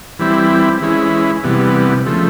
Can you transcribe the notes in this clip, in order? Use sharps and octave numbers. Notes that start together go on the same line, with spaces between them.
E3 G3 C4 E4
E3 G#3 C#4 E4
C3 E3 G3 B3
C#3 F3 A3